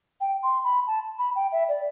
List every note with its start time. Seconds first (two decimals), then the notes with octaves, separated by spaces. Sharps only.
0.21 G5
0.43 C6
0.64 B5
0.87 A5
1.19 B5
1.36 G5
1.52 E5
1.69 D5